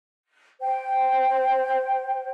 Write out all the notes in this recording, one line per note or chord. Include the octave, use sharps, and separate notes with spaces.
C5 G5